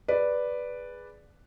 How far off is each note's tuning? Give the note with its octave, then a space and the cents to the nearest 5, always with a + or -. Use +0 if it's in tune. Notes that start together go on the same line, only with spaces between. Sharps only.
G#4 +0 B4 +0 D5 +0